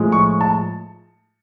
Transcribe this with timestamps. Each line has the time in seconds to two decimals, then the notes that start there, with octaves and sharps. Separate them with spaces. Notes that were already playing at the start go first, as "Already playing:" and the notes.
Already playing: A2 F3 G#3
0.12 C#6
0.41 A5